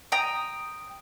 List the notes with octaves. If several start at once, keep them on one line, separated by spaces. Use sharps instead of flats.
G5 A#5 D#6